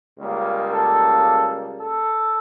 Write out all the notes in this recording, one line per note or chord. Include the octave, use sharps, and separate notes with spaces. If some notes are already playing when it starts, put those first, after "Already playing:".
C#2 C#3 G3 A#3
A4
A4